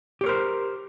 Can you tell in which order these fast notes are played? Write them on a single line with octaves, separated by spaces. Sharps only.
G4 C#5 A#4 C5